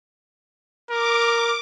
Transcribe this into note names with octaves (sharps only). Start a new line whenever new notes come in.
A#4 D6